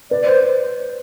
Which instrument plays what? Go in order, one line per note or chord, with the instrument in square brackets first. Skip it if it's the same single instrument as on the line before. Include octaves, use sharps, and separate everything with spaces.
[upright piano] B4 [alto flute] D5
[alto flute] C5